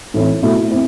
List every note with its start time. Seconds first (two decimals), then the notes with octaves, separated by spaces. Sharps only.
0.14 A2 E3 A3 C4 E4
0.43 B2 A3 E4
0.71 C4 E4